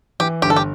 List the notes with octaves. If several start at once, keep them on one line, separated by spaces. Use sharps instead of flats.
E3 G4
G1 G4
A4
G4